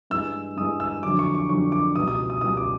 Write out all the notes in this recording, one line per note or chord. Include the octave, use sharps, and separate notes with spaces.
G2 E3 G#3 E6
G2 E3 G#3 D#6
E6
F2 D3 F#3 D6
C#6
C#6
F2 D3 F#3 C#6
D6
C#2 B2 G3 D#6
D#6
D#6
C#2 B2 G3 D#6
D6